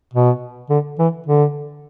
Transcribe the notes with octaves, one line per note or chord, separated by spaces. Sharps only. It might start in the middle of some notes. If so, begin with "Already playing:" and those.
B2
D3
E3
D3